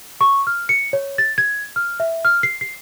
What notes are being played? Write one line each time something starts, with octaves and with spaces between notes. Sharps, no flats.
C#6
F6
C#7
C#5
A6
G#6
F6
E5
F6
C7
C7